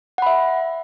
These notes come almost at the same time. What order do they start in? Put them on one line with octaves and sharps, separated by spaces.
F#5 B5 E5